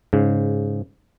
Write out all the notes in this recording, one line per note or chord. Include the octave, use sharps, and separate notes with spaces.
G#2 C#3